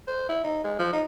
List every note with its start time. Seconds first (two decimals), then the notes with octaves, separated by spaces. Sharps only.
0.08 C5
0.29 E4
0.44 D#4
0.64 G#3
0.79 F3
0.93 D#4